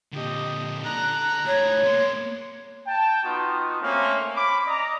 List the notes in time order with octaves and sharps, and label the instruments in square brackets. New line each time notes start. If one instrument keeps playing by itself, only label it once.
[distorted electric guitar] A#2 D3 [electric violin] G4 D#5
[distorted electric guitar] D3 [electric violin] A#5 F#6
[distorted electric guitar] A2 G#4 [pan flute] C#5
[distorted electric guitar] A#3 B3 [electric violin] C6
[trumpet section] G5 A5
B3 D#4 F4 F#4
A3 A#3 C4 C#4
C#4 B5 D6
D5 D#5 A#5